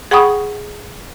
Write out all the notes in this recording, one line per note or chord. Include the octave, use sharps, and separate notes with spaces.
G#4 F#5 G5 B5 C#6 D#6